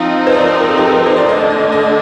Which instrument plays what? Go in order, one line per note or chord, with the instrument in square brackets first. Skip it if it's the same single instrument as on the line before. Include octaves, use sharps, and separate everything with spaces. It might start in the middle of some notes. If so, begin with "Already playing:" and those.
Already playing: [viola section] F3 C4 D#4 [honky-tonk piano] F4
[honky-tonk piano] C5
D5
A#4
A#4
A4
G4
A4
A#4
C5
D5
[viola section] D3 A3 D4 [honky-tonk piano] D#5
[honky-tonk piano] D#5
D#5